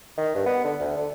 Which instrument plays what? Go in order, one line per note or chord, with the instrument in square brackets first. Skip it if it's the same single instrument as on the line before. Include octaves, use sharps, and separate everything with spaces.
[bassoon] D#3
G2
B3
D3
D2
D3